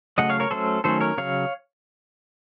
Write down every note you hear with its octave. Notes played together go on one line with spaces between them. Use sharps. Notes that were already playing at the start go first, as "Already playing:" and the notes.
C#3 F#3 A3 D#5 F#5
C#5 F5
A#4 C#5
F#3 A3 C#4 A4 C5
D#3 F#3 A3 C#4 A4 C5
A#4 C#5
C#3 F#3 C#5 F5